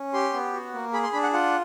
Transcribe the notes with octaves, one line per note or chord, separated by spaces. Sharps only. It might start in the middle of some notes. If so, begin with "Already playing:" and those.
Already playing: C#4
G4 C6
B3
F#4
A#3
G#4 B5
C6
D4 B5
F#5
F4 F#5